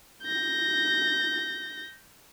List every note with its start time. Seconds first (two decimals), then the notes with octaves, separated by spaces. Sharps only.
0.23 G6 A#6